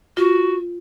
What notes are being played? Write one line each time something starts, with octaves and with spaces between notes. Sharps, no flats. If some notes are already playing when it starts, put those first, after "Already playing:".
F4 F#4